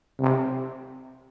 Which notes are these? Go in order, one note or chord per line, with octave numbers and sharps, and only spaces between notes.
C3